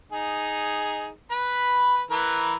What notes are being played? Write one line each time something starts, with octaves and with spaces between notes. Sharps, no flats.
D#4 G#4
B4 B5
E3 A#4 B4